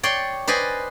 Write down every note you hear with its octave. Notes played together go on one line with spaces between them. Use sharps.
C#5 D5 G5 C6
B4 C5 D5 D#5 G#5